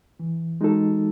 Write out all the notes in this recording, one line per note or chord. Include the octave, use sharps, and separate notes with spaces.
E3
G#3 D#4 F#4 A4